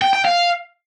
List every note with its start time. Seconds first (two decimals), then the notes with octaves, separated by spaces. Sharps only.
0.02 G5
0.13 G5
0.25 F5